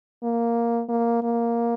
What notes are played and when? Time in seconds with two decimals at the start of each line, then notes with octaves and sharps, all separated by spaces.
0.23 A#3
0.89 A#3
1.22 A#3